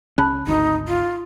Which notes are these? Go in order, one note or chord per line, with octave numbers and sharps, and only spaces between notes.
C#2 C#3 C#4 A5 B5 F#6
G#1 D2 D#4
F4